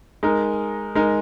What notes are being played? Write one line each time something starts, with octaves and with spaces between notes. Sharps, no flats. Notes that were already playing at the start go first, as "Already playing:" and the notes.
G#3 D#4 A#4
G#3 D#4 A#4